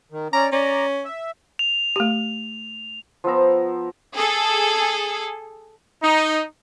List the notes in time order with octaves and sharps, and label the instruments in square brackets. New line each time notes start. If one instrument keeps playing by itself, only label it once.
[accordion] D#3
[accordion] C#4 D5 [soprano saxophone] A#5
[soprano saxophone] C#4 [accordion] D5 A#5
[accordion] E5
[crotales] F7
[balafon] A3 G4
[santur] F3 B3 E5 A#5
[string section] G#4 A4
[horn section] D#4